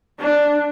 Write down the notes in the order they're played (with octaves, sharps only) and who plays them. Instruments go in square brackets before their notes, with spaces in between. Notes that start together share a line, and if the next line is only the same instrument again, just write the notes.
[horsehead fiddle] D4